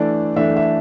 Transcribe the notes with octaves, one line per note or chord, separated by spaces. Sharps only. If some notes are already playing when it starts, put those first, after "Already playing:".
Already playing: E3 A3 D4 D5
E3 A3 D4 E5
E5